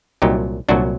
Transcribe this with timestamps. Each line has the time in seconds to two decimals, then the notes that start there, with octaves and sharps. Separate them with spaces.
0.22 C2 A#2 F#3 D#4 G4
0.69 C2 A#2 F#3 D4 F#4